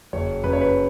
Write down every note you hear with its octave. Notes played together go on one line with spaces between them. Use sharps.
F#1 C#5
F#2 B4
C#5
B4